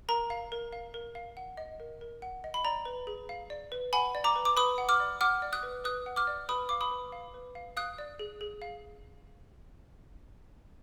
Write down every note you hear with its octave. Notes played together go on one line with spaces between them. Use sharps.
A#4 A#5
F5
A#4
F5
A#4
F5
F#5
D#5
A#4
A#4
F#5
D#5
B5
D5 A#5
B4
G#4
F5
D5
B4
F#5 G#5 B5
D5
A#5 D6
B4
D6
B4 B5 D#6
F#5
D6 F6
D5
F#5 D6 F6
D5
D#6 F#6
B4
B4 D#6 F#6
F#5
D6 F6
D5
B4 B5 D#6
F5 D6
B5 D#6
B4
F5
B4
F5
F5 D#6 F#6
D5
G#4
G#4
F5